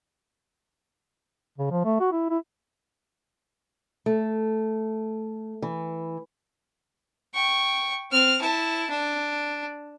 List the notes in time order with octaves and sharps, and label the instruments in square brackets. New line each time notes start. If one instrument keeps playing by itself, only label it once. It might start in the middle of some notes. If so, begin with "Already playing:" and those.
[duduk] C#3
F3
A3
F#4
E4
E4
[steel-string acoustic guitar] A3
E3
[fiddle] G5 C#6
C4 F6
E4 A5
D4